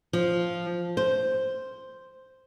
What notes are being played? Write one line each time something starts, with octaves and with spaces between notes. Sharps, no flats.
F3
C5